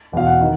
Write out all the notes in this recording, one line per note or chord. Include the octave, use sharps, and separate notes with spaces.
E1 E2 B2 F5
F#5
D#3